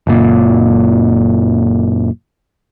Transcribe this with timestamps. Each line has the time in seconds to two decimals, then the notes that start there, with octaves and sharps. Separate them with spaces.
0.07 F#1 A#2